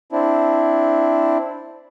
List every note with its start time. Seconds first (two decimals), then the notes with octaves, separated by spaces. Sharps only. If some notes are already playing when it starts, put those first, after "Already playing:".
0.12 C4 D4 E4